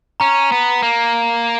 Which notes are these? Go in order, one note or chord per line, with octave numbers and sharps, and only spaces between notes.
C#4 A#5
B3
A#3